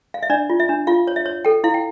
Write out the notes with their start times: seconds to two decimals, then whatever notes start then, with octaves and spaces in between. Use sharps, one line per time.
0.14 F5
0.23 E5
0.30 D4 D5
0.50 F4
0.60 E5
0.69 D4
0.87 F4 F5
1.07 C#5
1.16 E5
1.26 C#5
1.45 A4 G5
1.64 E4 F5
1.74 G5